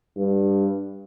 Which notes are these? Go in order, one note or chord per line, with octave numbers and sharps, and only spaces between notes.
G2